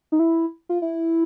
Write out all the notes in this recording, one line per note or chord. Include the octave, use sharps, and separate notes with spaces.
D#4
E4
F4
E4